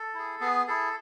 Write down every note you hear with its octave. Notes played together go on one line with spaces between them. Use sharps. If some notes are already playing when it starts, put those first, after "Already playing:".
Already playing: A4
E4 G#4
B3 G#4
E4 G#4 A4